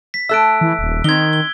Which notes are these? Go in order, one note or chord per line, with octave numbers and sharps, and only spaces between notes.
B6
A3 A4 E5 E6 F#6 D7
E3
D#1
D#3 C4 D#4 G#6 G7
G7